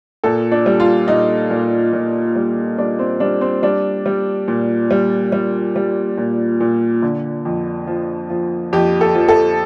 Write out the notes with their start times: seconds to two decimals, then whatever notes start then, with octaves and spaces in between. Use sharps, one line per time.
0.24 A#2 A4
0.52 D4
0.66 G3
0.80 F4
1.08 A#2 D#4
1.51 A#2
1.93 A#2
2.35 G3
2.78 G3 D4
2.99 C4
3.20 G3 D4
3.41 C4
3.63 G3 D4
4.06 G3
4.48 A#2
4.91 G3
5.32 G3
5.76 G3
6.18 A#2
6.61 A#2
7.02 D3
7.45 F2
7.87 F3
8.30 F3
8.73 F2 G4
9.01 A4
9.15 F3
9.29 A4